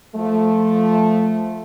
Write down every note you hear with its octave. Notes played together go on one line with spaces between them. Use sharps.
F3 A3